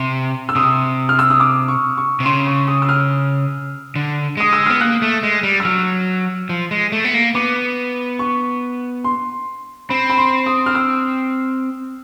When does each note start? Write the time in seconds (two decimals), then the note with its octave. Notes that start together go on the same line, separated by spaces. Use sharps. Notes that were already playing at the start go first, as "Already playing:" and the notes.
Already playing: C3
0.49 E6
0.55 C3 D#6
1.09 F6
1.19 E6
1.30 D#6
1.40 D6
1.68 C#6
1.97 C#6
2.20 C3
2.25 C#3 C6
2.47 C#6
2.68 D#6
2.82 E6
2.89 F6
3.96 D3
4.37 G#3 D#6
4.53 E6
4.66 B3 F6
4.81 A#3 F#6
5.02 A3
5.23 G#3
5.43 G3
5.60 E6
5.65 F#3 F6
6.49 F3
6.71 G#3
6.92 A3
7.05 B3
7.14 A#3
7.35 B3 D6
8.19 C#6
9.04 C6
9.89 C4 B5
10.10 B5
10.18 C6
10.46 D#6
10.66 F6
10.75 E6